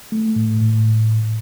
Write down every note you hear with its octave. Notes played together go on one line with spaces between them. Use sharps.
A3
A2
A2